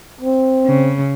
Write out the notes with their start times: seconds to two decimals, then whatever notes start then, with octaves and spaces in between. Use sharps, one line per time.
0.21 C4
0.67 C#3